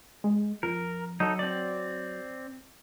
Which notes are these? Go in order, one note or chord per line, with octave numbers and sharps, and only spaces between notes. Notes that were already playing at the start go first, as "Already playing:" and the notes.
G#3
F2 A#4
F#3 D#4 A4
C4 D5